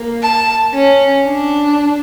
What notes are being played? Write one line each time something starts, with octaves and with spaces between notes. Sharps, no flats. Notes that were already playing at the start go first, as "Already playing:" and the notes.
Already playing: A#3
A5
C#4
D4